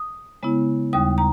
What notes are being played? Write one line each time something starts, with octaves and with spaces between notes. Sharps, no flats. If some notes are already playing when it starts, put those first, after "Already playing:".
Already playing: D#6
C#3 G#3 B3 E4
D#2 C#3 G3 D#6
A#5